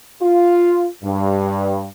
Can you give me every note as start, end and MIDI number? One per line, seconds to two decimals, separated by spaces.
0.21 0.85 65
1.04 1.86 43